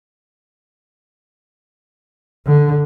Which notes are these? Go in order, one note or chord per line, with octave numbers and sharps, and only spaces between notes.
D3